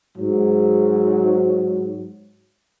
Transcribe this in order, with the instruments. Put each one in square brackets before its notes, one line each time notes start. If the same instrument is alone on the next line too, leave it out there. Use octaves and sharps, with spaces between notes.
[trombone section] G#2 F#3